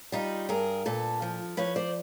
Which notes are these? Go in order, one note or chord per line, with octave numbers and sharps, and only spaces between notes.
G3 D#4 F4
G2 G#4 A#4
A#2 A4 B4
F3
F3 B4 C#5
C5 D5